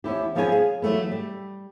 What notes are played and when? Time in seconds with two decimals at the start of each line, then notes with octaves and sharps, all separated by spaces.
0.04 E2 C#4 E4 G4
0.35 F2 F3 B3 G#4 C#5 G#5
0.52 G#4
0.82 E3 F#3 A3 B3
1.12 G3